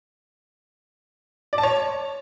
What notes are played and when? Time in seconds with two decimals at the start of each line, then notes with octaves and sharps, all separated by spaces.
1.53 D5
1.58 A5
1.63 C#5